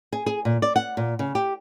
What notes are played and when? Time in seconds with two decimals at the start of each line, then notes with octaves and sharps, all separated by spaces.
0.13 G#4
0.26 G#4
0.45 A#2
0.62 D5
0.76 F#5
0.97 A#2
1.19 C#3
1.35 G4